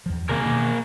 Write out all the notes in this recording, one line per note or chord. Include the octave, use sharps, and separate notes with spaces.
E2 G2 F3
C3 D#3 A#3 B3 G#4 A#4
B2 D#3 E3